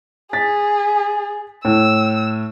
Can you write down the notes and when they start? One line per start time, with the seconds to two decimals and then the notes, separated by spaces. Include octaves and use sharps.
0.33 G#4 A6 B6
1.65 A2 E6